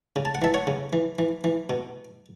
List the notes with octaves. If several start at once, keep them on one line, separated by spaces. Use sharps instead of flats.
C#3
A5
F#5
E3 E5 A5
C#5 F#5
C#3
E3
E3
E3
B2